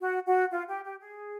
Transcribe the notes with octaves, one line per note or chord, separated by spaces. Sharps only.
F#4
F#4
F4
G4
G4
G#4